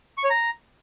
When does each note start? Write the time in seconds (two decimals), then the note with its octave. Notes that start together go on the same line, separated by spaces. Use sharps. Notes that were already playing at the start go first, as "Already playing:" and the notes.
0.18 C#6
0.24 C#5
0.30 A#5